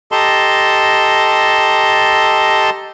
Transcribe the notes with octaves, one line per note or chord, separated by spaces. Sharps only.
G4 A4 D#5 A5 A#5 C6